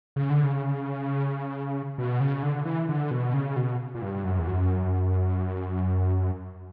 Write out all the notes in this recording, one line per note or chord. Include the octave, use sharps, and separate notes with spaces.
C#3
D3
C#3
B2
C#3
D3
E3
D3
B2
C#3
B2
A#2
G2
F#2
E2
F#2